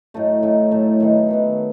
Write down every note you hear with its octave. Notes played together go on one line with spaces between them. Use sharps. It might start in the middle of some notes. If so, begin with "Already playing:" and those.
A2 F#3 A3 D#4
A2 F#3 A3 D#4
A2 F#3 A3 D#4
D#3 F#3 B3
D#3 F#3 B3